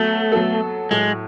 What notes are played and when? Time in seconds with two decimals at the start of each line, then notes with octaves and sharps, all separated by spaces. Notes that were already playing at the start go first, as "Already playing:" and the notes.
Already playing: F#3 A3 B3 F#4 A4
0.32 F#3 B3 F#4 A4
0.91 A2 F#3 G#3 A3